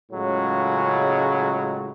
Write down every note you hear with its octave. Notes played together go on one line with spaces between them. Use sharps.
C#2 A2 C#3 F#3 G#3